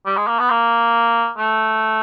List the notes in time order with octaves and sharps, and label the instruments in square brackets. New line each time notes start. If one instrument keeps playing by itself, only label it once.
[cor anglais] G3
G#3
A#3
B3
A#3
A3